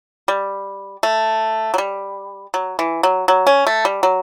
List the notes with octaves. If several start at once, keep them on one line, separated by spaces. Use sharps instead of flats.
G3
A3
F#3
G3
F#3
E3
F#3
F#3
C#4
A3
G3
F#3